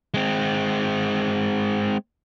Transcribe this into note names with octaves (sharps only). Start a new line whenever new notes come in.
G#3 C4